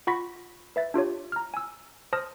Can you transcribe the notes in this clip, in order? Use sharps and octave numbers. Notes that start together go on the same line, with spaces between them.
F4 F#5 B5 C#6 A#6 B6
B4 E5 A6
D4 F4 G4 C#5
A#5 F6
G#5 E6
C5 A5 D#6 F6 A#6